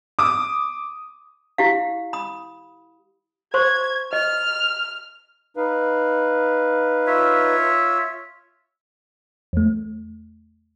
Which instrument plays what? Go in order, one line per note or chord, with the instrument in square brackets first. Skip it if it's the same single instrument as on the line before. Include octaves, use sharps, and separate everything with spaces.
[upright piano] D6 D#6
[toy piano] E4 G4 F5
B5 D#6
[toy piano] C5 C6 C#6 [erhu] G#6
[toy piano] D#5 [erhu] F6
[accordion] D#4 B4 F5
[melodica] F4 C#5 E5
[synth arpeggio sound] E2 A3